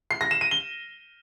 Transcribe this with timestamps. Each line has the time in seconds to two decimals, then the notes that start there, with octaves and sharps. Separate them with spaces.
0.11 C7
0.21 A#6
0.31 E7
0.41 D#7
0.51 G7